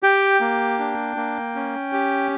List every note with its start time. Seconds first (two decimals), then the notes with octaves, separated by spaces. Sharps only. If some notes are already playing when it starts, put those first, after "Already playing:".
0.03 G4 G5
0.41 A#3
0.79 D4
1.17 A#3
1.55 C#4
1.93 G4